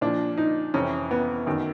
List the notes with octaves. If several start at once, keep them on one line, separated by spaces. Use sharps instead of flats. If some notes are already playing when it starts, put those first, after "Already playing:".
A#2 F3 D4
D#4
F2 C3 E3 C#4
B3
F#2 D#3